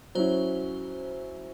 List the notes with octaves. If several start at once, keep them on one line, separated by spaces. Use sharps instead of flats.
F#3 C#4 E4 C5